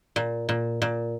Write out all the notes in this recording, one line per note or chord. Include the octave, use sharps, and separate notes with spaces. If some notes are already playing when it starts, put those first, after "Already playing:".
A#2
A#2
A#2